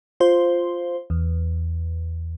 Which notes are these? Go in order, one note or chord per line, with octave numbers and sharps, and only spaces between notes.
F4 C5
E2